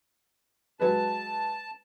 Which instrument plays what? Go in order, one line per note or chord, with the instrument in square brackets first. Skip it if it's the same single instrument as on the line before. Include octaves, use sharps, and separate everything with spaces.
[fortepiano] F#3 G#3 B4 [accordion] A5